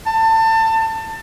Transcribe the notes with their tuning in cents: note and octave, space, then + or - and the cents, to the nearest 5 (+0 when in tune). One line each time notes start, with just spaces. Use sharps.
A5 +25